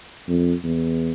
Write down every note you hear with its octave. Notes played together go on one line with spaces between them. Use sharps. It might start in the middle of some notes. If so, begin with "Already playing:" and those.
F2
E2